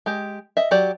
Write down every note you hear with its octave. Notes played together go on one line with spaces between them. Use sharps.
G#3 G4
D#5 E5
F#3 F#4 G4 D5